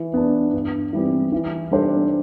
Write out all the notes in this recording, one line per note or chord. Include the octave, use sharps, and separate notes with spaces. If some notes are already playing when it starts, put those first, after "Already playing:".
Already playing: E3
B3 D4
G2
E3 G3 C4
E3
G3 D4 A4 C5